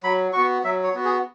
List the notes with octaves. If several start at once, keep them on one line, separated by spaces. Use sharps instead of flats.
F#3 B5
B3 F#4 C#6
F#3 E5
C#5
B3 F#4
G#4